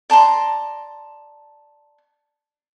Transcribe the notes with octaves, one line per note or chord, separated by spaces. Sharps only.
D5 A5 A#5 C6